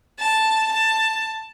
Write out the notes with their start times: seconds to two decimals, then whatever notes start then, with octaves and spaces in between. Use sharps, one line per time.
0.19 A5
0.72 A5